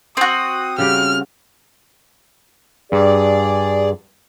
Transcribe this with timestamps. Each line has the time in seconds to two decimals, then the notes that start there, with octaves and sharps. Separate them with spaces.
0.17 C4 F#4 D#6
0.78 C#3 G3 G4 F6
2.92 G2 G#4 D5